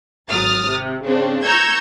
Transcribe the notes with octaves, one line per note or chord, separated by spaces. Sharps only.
G#1 F#3 D#6 F6 A6
C3
C#3 C4 D4
A#5 C#6 E6 G6 G#6